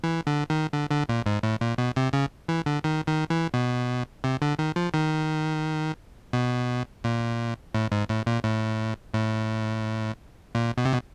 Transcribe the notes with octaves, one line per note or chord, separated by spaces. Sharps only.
E3
D3
D#3
D3
D3
A#2
G#2
A2
A#2
B2
C3
C#3
E3
D3
D#3
D#3
E3
B2
C3
D3
D#3
F3
D#3
B2
A#2
A2
G#2
A2
A#2
A2
A2
A#2
B2
C3
B2